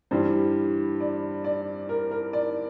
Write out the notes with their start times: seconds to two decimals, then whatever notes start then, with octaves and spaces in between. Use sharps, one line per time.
0.11 G2 E3 G3 C5
1.00 D5
1.44 D5
1.89 A#4
2.11 A#4
2.33 D5